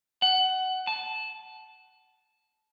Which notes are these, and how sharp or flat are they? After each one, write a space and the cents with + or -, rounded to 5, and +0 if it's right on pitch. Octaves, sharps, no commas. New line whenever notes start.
F#5 +20
A5 -15